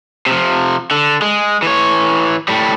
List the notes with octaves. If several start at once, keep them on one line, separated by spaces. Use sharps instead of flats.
C3 F3
D3
G#3
E3 C#5
A2 G3